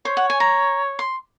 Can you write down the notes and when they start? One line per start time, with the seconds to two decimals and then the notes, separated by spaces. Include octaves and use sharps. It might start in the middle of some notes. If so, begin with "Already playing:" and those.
0.05 C5 C#5
0.17 F#5
0.30 G#5
0.40 A#5
0.99 C6